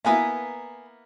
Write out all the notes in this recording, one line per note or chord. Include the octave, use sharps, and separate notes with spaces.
A#3 B3 E4 B4 G#5 A#5